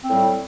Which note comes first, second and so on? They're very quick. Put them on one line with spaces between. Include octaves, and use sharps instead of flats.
C4 A2 G3